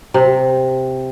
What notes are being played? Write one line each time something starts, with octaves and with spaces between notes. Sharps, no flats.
C3